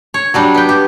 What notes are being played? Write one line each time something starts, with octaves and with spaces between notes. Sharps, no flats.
C#5
F#3 G3 D4
B3 G5
G4